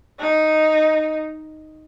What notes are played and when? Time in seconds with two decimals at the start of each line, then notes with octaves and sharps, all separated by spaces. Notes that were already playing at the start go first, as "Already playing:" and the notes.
0.19 D#4